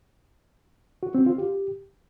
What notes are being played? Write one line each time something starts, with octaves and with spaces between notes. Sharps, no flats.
F#4
C4
F4
G4